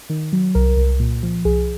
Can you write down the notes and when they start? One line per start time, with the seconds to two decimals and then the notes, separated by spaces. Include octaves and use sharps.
0.10 D#3
0.33 F#3
0.55 C2 A#4
0.77 C2
1.00 A#2
1.23 F3
1.45 C2 G#4